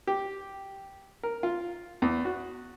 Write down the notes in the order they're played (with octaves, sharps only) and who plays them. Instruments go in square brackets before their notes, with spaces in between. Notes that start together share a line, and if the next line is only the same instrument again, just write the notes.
[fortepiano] G4
A#4
F4
E2
F#4